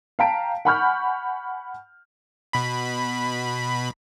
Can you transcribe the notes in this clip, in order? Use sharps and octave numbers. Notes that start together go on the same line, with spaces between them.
F5 G5 A5 A#5 B6 D7
F#5 G#5 B5 C#6 F6 G6
B2 B5